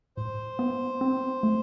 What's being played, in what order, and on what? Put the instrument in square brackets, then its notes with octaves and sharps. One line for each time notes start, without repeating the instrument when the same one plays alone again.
[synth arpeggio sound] A2 [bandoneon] C5
[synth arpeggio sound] B3
C4
A3